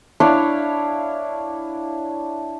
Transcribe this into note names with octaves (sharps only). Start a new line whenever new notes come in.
D4 E4 C#5 F5